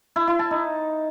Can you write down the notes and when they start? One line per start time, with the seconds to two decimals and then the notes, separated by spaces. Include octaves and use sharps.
0.16 E4
0.27 E4
0.39 A5
0.51 D#4